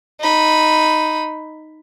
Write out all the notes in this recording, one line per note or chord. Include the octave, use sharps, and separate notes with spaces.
D#4 B5